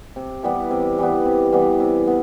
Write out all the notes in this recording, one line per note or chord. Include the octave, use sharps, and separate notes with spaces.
C3
E3 G3 B3
C3
E3 G3 B3
C3
E3 G3 B3
C3
B3